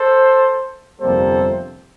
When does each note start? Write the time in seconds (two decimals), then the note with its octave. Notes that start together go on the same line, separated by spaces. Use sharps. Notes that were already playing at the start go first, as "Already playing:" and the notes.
Already playing: A4 C5
1.00 G1 F2 C3 G3 A#3 A4 C5